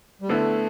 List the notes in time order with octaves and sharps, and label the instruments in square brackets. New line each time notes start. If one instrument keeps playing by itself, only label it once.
[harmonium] G3
[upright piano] D3 B3 E4 [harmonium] A3